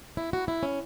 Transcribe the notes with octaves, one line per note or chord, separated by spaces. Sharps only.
E4
F#4
E4
C#4